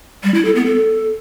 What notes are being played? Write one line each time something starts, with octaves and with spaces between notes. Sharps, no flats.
G3
E4
A4
B3
A4